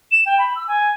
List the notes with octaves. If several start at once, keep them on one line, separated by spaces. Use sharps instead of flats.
E7
G5
B5
E6
G#5